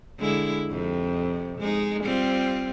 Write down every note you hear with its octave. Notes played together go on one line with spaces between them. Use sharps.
D3 G#3 E4
F2 C3
G#3 D#4
G3 C4 F4